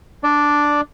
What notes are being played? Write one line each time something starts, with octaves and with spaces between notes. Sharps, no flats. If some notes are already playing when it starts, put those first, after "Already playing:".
D4 D5